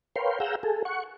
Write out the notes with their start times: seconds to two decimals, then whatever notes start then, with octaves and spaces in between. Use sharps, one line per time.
0.16 A#4 B4 C#5 F5 G5 C6
0.40 G#4 F5 F#5 A#5 E6 G6
0.63 G#4 A4
0.85 F#5 C#6